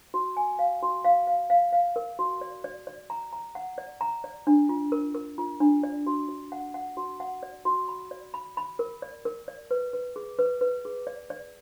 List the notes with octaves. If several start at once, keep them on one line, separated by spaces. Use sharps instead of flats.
F#4
G#5
F5
F#4
F5
F5
F5
F5
A#4
F#4
D5
D5
D5
A#5
A#5
F#5
D5
A#5
D5
D4
F4
A#4
A#4
F4
D4
D5
F#4
F#4
F#5
F#5
F#4
F#5
D5
F#4
B5
D5
B5
B5
A#4
D5
A#4
D5
B4
B4
G#4
B4
B4
G#4
D5
D5